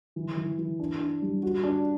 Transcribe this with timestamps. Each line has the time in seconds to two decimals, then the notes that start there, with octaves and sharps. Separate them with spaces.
0.16 E3
0.37 E3
0.58 E3
0.80 D4
1.00 D4
1.22 G3
1.43 F#4
1.64 D4